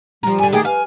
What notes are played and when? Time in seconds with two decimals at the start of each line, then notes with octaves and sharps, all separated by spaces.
0.23 F3 G3 A#4
0.38 G2 D3 G#5
0.53 D#3 A3 G4 G#4 G5 D#6
0.65 B4 F5 G#5